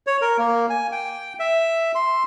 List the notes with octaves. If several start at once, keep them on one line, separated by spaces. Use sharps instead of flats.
C#5
A#4
A#3
G#5
G5
E5
C6